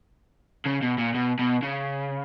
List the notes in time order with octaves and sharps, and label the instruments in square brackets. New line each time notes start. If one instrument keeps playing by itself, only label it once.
[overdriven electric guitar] C#3
B2
A#2
B2
B2
C#3